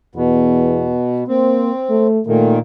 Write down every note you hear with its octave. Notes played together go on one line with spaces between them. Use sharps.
E2 B2
A#3 C4
A3
A#2 D#3 A3